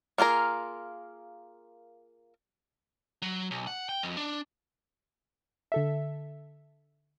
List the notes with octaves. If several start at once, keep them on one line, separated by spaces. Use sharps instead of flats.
A#3 F4 G#4 A#4
F#3
B1
F#5
G5
F2
D4
D3 A4 E5